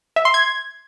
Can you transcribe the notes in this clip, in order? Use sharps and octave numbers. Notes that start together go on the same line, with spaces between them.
E5
C6
G#6